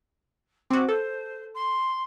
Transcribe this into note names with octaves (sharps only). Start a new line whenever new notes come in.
C4 F#4 D6
A4 C5
C6